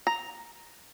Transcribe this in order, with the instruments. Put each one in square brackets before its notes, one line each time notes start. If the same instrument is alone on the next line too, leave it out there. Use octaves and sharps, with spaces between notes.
[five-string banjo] A#5